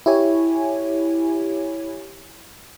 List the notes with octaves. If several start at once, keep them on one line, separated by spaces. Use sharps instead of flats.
E4 G4 C#5 G#5